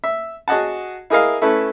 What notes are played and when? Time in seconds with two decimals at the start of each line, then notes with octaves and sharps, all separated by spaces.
0.04 E5
0.48 F#4 G#4 D#5 F#5 A5
1.10 E4 G#4 A#4 D#5 F5
1.41 A3 C#4 E4 A4 B4